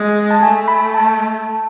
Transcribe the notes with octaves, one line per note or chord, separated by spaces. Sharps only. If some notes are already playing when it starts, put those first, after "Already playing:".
Already playing: G#3
A5
A3 G#5
B5
A5